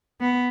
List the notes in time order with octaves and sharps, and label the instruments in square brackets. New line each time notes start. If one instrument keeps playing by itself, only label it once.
[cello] B3